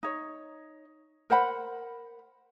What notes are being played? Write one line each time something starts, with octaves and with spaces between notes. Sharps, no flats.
D#4 C#5
A#4 C5 F#5 B5